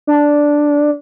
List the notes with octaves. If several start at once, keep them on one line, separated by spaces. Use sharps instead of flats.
D4